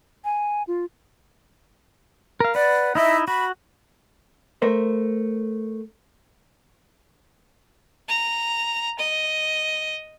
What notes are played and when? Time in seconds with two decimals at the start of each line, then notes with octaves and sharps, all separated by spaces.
0.24 G#5
0.67 F4
2.40 A#4 F5
2.55 B4 D5 F#5
2.95 D#4 E4 D#5 E5
3.28 F#4 B5
4.62 A3 A#4 C5
8.08 A#5
8.99 D#5